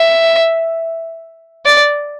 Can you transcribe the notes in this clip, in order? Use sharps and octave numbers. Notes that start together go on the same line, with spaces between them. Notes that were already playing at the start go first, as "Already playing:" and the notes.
Already playing: E5
D5